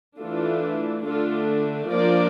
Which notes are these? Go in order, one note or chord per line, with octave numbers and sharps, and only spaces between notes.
E3 A3 D4 F4 A4
D3 A3 D4 F4 A4
F3 A#3 D4 A#4 D5